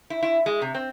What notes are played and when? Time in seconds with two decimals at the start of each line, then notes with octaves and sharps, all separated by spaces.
0.10 E4
0.23 E4
0.46 G#3
0.62 C3
0.75 C4